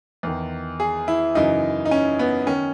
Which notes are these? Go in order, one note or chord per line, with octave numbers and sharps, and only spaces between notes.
E2 D#3
G#4
E4
F#2 C#3 E3 D#4
D#4
C#4
B3
D#3 C#4